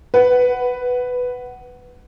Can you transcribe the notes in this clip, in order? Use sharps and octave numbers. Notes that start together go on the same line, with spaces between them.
B4 F#5